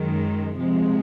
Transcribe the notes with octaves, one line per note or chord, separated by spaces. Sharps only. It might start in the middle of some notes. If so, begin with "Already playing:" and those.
Already playing: F#2 D#3 G#3
C3 F3 G#3